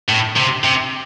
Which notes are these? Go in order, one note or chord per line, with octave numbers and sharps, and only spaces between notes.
A2
C3
C3